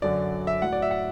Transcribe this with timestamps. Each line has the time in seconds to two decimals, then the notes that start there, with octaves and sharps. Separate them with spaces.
0.02 F#2 D3 F#3 D5
0.47 E5
0.62 A2 F#3 F#5
0.72 D5
0.82 E5
0.91 F#5